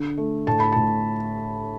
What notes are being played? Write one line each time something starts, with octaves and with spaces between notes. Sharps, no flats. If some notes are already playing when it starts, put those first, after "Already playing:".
Already playing: D3
A3
A2 A5
B5
A2 A5